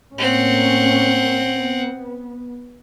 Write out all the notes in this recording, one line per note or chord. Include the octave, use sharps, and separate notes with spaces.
A2 A#3 C4 C#4 F#5
B3